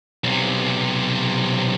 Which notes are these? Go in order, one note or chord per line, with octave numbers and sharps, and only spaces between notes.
B1 C3